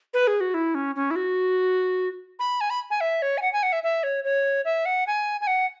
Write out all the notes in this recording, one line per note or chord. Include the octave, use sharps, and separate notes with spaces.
B4
G#4
F#4
E4
C#4
C#4
E4
F#4
B5
G#5
B5
G#5
E5
C#5
G#5
F#5
G#5
F#5
E5
E5
C#5
C#5
E5
F#5
G#5
G#5
F#5